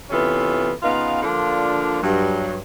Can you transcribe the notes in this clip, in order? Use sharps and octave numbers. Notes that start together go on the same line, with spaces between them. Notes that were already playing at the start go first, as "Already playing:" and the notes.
C3 E3 B3 C#4 F4 A4
C#3 B3 D#4 F4 B4 F5
D3 F3 A#3 D4 F4
G2 F#3